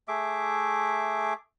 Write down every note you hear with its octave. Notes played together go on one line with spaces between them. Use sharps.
A3 G#4 E5 D6